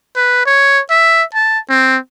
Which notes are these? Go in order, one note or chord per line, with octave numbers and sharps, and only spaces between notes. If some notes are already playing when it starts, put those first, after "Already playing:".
B4
C#5
E5
A5
C4